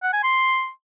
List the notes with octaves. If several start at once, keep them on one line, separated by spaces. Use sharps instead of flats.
F#5
G#5
C6